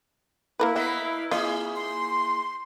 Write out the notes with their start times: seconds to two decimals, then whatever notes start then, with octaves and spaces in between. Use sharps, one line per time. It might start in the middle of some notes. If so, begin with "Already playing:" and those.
0.60 A#3 E4 A#4 B4
0.76 A#3 B3 B4 D#5 E5
1.31 A#3 E4 F4 G#4 D#5
1.75 C6